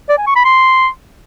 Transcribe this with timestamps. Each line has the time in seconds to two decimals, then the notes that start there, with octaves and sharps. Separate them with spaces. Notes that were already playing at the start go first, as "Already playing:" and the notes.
0.09 D5
0.18 G#5
0.27 C#6
0.36 B5
0.45 C6